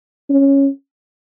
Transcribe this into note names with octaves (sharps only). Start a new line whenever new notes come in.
C#4